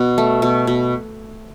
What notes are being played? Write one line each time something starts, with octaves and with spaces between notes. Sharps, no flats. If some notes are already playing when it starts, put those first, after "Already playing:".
Already playing: B2 F#5
A3
B2
B2